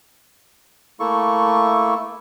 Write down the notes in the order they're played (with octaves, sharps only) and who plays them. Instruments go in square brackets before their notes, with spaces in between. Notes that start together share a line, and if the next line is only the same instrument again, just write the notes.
[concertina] A3 A#3 E4 A4 C#6